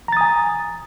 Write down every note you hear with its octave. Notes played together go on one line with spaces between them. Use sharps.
G#5 A#5 D#6 A6